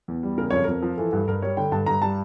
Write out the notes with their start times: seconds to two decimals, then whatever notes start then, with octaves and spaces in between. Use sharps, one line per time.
0.08 E2
0.23 G3
0.38 C#3 A#4
0.50 F2 C#5
0.64 F2 A#4
0.82 F3
0.97 E3 A4
1.12 G2
1.27 G2 A#4
1.42 G3 C#5
1.57 D3 G5
1.72 G2 A5
1.86 G2 A#5
2.02 G3 A5